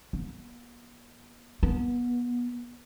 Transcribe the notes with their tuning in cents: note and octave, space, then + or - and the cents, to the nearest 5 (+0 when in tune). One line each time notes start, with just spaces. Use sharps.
B3 -45
B3 -25